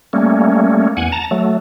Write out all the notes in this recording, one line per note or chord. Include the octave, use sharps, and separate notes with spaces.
G3 A3 A#3 C#4
E2 F#5 G#5
A5 A#5
F#3 A3